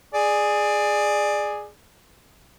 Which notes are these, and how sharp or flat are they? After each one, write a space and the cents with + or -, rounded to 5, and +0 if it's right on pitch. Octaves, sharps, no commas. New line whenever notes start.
G#4 +0 D5 +20